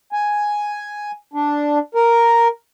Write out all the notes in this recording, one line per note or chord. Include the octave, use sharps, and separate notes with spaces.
G#5
D4
A#4